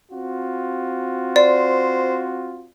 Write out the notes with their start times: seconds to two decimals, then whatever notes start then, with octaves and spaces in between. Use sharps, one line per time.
0.12 C4 F4 F#4
1.36 C5 D5